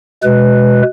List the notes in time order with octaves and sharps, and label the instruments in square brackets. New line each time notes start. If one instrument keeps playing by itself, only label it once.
[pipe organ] B2 G#3 B4